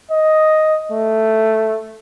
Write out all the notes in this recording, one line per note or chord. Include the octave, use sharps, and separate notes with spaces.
D#5
A3